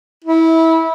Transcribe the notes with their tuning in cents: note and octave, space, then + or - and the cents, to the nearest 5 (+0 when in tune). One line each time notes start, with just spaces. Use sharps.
E4 -20